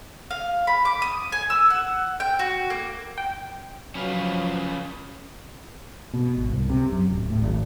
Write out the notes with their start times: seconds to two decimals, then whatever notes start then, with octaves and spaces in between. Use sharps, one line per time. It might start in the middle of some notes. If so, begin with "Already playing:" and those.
0.31 F5
0.67 B5
0.85 D6
1.02 D#6
1.32 G#5
1.50 E6
1.70 F#5
2.20 G5
2.39 F#4
2.70 A#3
3.18 G5
3.95 F3 F#3 C#4 B4 F5
6.14 B2
6.37 G#1
6.50 C2
6.70 C3
6.92 F#2
7.10 D1
7.30 A2
7.42 G#1